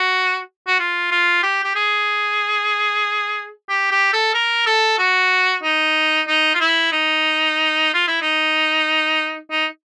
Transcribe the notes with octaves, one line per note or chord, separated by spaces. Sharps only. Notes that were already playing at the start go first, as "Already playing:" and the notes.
Already playing: F#4
F#4
F4
F4
G4
G4
G#4
G4
G4
A4
A#4
A4
F#4
D#4
D#4
F4
E4
D#4
F4
E4
D#4
D#4